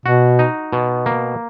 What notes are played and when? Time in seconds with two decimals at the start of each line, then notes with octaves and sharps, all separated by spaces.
0.05 B2 F#4
0.39 D#4
0.73 B2
1.06 A#3